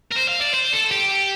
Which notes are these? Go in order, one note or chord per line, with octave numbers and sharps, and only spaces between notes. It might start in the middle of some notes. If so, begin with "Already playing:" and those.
A#4
C5
F5
D5
C5
A4
G4